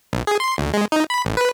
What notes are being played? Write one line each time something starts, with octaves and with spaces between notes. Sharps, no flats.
B1
G#4
C6
D2
G#3
D#4
B5
A1
B4